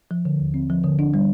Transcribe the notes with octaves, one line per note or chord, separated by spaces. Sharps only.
F3
D3
D#2
C4
F3
D3
D4
G3